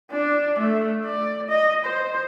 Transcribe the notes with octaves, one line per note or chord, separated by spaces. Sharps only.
D4
A3
D5
D#5
C5